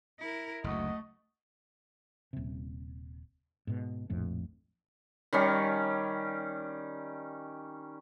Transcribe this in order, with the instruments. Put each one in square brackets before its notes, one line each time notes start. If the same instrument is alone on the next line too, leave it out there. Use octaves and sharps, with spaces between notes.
[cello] E4 A#4
[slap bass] F#1 D2 [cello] A3 [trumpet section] F#4 D#5
[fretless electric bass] D#1 C3
G#2 B2
A#1 F2 A2
[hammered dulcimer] D#3 G3 C#4